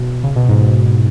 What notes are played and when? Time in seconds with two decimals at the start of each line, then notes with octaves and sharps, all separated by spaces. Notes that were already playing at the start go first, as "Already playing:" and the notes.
Already playing: B2
0.23 C#3
0.36 B2
0.48 G#2